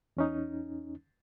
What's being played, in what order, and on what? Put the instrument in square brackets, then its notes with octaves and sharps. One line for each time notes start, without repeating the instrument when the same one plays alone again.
[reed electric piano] E2 C#4 D#4